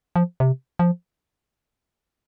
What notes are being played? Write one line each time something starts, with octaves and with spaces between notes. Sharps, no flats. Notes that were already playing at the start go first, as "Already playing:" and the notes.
F3
C3
F3